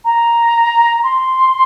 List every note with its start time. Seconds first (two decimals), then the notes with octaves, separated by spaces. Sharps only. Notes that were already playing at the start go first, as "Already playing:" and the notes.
0.05 A#5
1.03 C6